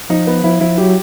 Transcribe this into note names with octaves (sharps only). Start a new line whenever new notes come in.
F3 D#4
B3
F3 E4
F3 E4
F#3 G4